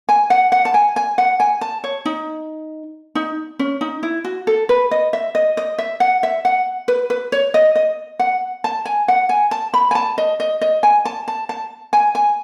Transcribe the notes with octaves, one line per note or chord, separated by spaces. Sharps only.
G#5
F#5
F#5
A5
G#5
G#5
F#5
G#5
A5
C#5
D#4
D#4
C#4
D#4
E4
F#4
A4
B4
D#5
E5
D#5
D#5
E5
F#5
E5
F#5
B4
B4
C#5
D#5
D#5
F#5
A5
G#5
F#5
G#5
A5
B5
G#5
A5
D#5
D#5
D#5
G#5
A5
A5
A5
G#5
G#5